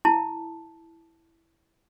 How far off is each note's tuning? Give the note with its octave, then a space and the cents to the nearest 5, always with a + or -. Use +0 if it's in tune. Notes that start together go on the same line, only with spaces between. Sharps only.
E4 +0 A5 +0